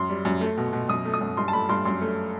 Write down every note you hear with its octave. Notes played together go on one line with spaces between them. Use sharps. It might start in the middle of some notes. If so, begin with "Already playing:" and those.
Already playing: F#2 C6
G3
F#2
A3
B2
B2
F#2 D#6
A3
D#6
F#2
G2 C6
A5
A3 B5
G2 C6
F#2 C6
A3